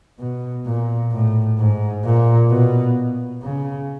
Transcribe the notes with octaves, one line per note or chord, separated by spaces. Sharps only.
B2
A#2
A2
G#2
A#2
B2
C#3